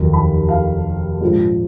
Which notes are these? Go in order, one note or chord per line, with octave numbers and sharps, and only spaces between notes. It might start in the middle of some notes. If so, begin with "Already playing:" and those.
Already playing: F1 D#2 D#3 F#3
B5
F5
A#1 G#2 F3